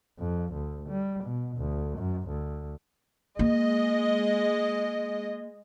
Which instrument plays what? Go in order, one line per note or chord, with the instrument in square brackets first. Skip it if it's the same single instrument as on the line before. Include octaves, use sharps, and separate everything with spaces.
[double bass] F2
D2
G3
B2
D2
F#2
D2
[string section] G#3 D#5 [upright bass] A#3